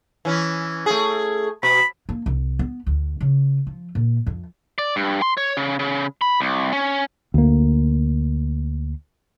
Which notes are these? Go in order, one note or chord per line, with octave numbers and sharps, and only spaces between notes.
E3 C#4
A3 G#4
B2 B5
A#3
C2
B3
D2
C#3
F3
A#2
F2
D5
G2
C6
C#5
C#3
C#3
B5
C2
C#4
D2 A#3